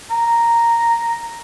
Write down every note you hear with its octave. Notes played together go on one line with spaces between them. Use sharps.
A#5